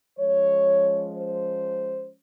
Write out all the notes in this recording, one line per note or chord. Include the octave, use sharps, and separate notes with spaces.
F3 G#3 C#4 C#5
C5